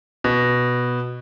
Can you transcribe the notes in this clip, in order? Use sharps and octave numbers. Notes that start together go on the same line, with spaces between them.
B2